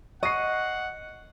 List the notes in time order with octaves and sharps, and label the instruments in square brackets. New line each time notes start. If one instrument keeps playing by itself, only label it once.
[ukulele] D#5 [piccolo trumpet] F#5 [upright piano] C#6 C7